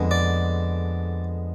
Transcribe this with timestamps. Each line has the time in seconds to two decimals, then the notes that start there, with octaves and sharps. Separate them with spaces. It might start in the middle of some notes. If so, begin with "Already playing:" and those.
Already playing: F2 D3 G#3 B3
0.11 D5